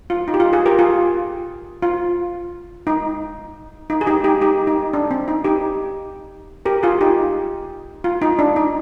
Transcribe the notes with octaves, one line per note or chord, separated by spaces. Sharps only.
F4
D#4
G4
F4
F4 G#4
G4 A#4
F4 G#4
F4
D#4
D#4
G#4
D#4 G4
D#4 G4
D#4 G4
D#4
D4
C4
D#4
D#4 G4
G4 A#4
F4 G#4
D#4 G4
F4
D#4
D4
D#4